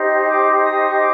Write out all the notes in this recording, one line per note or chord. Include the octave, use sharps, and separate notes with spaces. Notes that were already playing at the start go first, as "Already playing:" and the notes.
Already playing: D#4 G4 C5
D6
D#6
C#6
D6